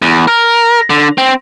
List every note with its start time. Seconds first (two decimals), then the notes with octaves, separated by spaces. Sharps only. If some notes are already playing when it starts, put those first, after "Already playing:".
0.02 E2
0.28 A#4
0.90 D3
1.18 C4